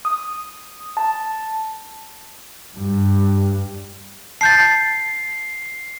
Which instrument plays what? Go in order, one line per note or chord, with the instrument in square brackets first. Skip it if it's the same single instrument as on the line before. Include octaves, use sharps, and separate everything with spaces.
[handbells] D#6
A5
[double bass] G2
[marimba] A5 G6 A6 [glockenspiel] C7